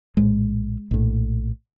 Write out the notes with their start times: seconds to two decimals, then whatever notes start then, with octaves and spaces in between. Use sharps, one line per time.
0.17 A#1 A2 G#3
0.91 A#1 A2